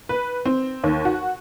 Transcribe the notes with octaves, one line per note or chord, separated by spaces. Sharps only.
B4
C4
D#2
F#4